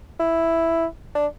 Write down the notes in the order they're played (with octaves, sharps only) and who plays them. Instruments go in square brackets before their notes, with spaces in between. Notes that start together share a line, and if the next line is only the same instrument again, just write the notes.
[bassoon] E4
D4